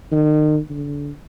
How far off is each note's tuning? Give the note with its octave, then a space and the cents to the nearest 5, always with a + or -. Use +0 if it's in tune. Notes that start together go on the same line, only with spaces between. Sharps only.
D#3 -35
D3 -25